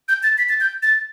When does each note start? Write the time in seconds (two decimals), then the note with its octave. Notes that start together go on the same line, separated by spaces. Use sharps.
0.08 G6
0.23 A6
0.38 B6
0.49 A6
0.61 G6
0.83 A6